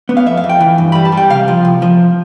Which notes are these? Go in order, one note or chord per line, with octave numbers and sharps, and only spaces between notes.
B3
F5
F2 E5
F5
F2
G5
E3
G2
G3 B5
A5
G3
G5
C3 F5
F3
C2
F3